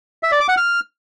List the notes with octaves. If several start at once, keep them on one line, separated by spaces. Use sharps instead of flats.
E5
D5
D6
F#5
F6